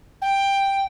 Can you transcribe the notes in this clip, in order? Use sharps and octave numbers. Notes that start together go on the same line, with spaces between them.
G5